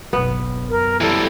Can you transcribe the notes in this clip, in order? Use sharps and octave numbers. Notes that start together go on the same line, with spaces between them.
F#1 B1 B3
F#2 A#4
E3 G3 A4